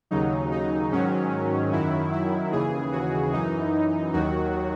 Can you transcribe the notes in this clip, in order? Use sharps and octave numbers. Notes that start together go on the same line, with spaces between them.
D#2 C#3 F#3 D#4
D#4
G#2 D#3 F#3 C#4
F#2 D#3 F#3 E4
E4
D#2 C#3 E3 G#4
F#4
F#2 E3 D#4
D#2 D#3 F#3 F#4